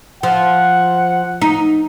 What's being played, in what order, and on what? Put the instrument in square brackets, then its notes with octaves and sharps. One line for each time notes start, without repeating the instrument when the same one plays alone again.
[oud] F3 [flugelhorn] F#5
[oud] D#4